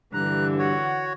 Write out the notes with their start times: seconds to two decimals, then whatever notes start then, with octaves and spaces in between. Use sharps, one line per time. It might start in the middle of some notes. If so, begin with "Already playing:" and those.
0.14 G2 D3 E3 A#5 F#6
0.59 F#4 C#5 F#5